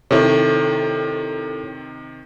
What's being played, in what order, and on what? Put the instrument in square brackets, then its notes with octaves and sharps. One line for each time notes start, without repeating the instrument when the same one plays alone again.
[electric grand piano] C3 D#3 [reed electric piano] E4 A4 C#5